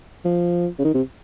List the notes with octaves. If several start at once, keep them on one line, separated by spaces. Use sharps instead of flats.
F3
C#3
D#3
C3